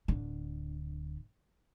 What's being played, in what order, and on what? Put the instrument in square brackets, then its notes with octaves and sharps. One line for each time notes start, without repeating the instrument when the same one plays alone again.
[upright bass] D1 D3